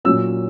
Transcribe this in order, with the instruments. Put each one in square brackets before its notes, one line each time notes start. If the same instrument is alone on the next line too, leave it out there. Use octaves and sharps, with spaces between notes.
[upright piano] A#2 F#3 C#4 E6